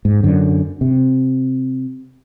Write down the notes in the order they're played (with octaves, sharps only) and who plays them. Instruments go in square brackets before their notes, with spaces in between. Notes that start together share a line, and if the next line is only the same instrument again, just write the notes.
[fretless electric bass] G#2
F#2 D3
C3